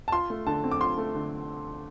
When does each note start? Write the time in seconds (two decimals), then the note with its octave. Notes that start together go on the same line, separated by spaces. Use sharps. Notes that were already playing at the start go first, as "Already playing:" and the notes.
0.08 A5
0.12 F4 C6
0.30 A3
0.47 D3 A5
0.64 C4
0.71 D6
0.81 F4 C6
0.98 A3
1.15 D3